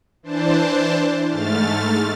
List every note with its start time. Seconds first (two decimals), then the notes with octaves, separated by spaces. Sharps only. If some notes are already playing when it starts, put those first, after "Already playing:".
0.23 E3 D4 C5 A5
1.28 G#2 A3 F6 A6